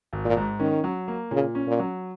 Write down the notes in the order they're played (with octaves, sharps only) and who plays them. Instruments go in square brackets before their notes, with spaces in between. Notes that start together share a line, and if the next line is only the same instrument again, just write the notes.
[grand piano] G#1
[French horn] A#2
[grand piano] G#2
[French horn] D#3 [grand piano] C#4
[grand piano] F#3
A#3
[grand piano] A#2 [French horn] C#3
[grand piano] C#4
[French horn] A#2
[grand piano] F#3